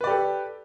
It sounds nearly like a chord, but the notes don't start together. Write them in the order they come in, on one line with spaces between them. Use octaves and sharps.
B4 D5 G4 A4